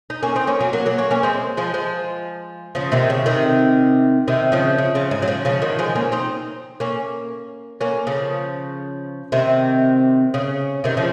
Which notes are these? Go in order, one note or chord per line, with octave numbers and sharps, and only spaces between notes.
D#4
A#3 C#4
C4 D#4
A#3 C#4
F#3 A#3
F#3 A#3
F#3 A#3
A#3 C#4
A#3 C#4
G#3 C4
F3 G#3
F3 G#3
C#3 F3
C3 D#3
C#3
C3 D#3
C3 D#3
C#3 F3
C#3
C#3 F3
G#2
F#3
C#3 F3
C#3 F3
D#3 F#3
F3 G#3
A#3 C#4
C4 D#4
A#3 C#4
A#3 C#4
C#3 F3
C3 D#3
C#3
C3 D#3
C#3 F3